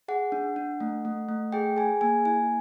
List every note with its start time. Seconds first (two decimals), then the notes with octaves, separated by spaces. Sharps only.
0.08 G#4 F#5
0.32 D4
0.56 D4
0.80 A3
1.05 A3
1.29 A3
1.52 G#4 G5
1.77 G#4 G#5
2.01 A#3 G#5
2.25 E4 G#5